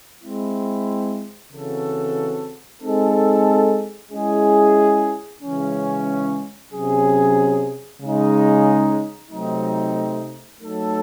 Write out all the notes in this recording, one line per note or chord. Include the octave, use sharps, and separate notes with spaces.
G#3 C4 E4
C#3 E3 C4 F#4 A4
G#3 C4 D#4 A4
G#3 C#4 E4 G#4
C#3 E3 G#3 C#4
C3 F#3 C#4 G#4
C#3 G#3 D#4
C3 F#3 A3 C4 D#4
F#3 A3 D#4 A4